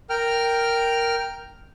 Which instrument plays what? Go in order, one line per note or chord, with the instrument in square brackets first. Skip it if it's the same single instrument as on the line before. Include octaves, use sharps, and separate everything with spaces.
[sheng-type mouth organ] A#4 G5 F6